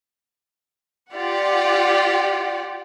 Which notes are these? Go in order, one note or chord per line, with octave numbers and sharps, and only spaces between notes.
F4 G4 D5 F#5